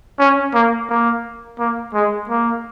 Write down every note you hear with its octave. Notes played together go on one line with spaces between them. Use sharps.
C#4
A#3
A#3
A#3
G#3
A#3